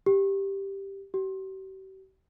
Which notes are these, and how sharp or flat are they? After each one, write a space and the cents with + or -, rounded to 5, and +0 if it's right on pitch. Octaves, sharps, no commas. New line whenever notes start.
G4 +0
G4 -45